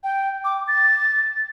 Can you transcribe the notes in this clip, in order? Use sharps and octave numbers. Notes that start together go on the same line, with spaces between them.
G5
D6
A6